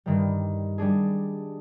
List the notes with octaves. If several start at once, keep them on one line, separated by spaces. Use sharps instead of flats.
G2 D#3 G3
G3 D4 G#4